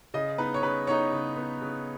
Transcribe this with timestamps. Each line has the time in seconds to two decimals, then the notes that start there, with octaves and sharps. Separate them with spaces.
0.14 C#3 D#5
0.38 B3 D#4 B4
0.54 C#5
0.63 C#3 B4
0.87 B3 D#4 C#5
1.12 C#3
1.37 B3 D#4
1.62 C#3